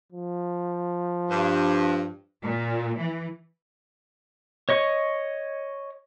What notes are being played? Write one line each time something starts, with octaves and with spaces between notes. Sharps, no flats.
F3
G2
A#2
E3
C#5 D#5 C#6